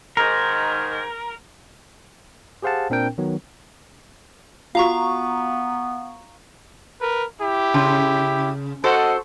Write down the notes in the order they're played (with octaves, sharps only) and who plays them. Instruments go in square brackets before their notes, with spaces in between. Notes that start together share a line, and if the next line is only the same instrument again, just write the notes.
[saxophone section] G#2 D#3 [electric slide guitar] A#4
[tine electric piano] G4 G#4 C5 F5 F#5 A5
A#2 C4 D4 A#4 G5
D#3 F#3 B3
[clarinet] B3 [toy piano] F4 F#4 [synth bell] F5 A#5 C#6
[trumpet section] A#4 B4
E4 G4
[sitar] C#3
[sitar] F#4 A4 C5 [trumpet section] D#5 F#5